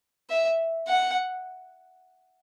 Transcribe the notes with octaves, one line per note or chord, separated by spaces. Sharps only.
E5
F#5